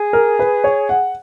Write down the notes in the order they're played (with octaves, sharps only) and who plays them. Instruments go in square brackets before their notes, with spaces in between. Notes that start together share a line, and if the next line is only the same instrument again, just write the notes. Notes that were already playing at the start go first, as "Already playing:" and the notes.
Already playing: [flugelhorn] G#4
[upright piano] A#4
B4
C#5
F#5